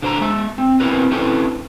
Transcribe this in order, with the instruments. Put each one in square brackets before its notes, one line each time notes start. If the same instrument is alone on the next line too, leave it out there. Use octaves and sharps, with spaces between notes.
[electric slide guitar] D3 C5 A#5
G#3 E5
C4
B3 C4 E4 A#4 B4
C4 C#4 E4 A4 B4 C5